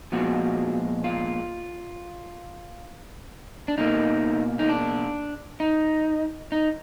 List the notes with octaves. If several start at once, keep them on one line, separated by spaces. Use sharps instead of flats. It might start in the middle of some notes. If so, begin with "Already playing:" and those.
A#2 F3 G#3 B3 F#4
F4
D4
B2 A#3 D#4
D#4
D4
D#4
D#4